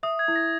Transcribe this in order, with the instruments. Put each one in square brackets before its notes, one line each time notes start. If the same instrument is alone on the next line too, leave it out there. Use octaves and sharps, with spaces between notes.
[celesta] E5 [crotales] D#6
[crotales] G#6
[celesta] E4
[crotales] A#6